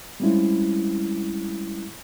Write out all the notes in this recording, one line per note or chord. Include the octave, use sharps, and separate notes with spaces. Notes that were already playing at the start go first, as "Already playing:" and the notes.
G3 G#3 C4 C#4 E4 F4